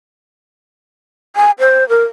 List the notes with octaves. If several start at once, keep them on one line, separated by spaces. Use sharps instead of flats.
G#5
C5
A#4